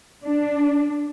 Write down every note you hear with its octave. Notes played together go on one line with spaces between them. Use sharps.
D4